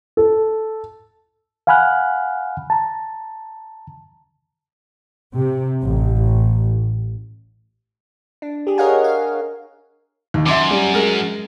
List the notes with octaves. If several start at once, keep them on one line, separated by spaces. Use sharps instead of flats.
A4
F5 F#5 G#5 B5 F6 F#6
A5 A#5
C3
A1
D4
G4 G#4
A#4 C#5 D#5 F5 F#5 G#5
F5
D#2
F#2 E5 C6 D6
G3
G#3 G#4 A#4